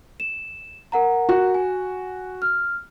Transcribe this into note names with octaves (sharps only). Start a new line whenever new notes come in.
E7
A#4 F#5 A#5
F#4
G#5
F6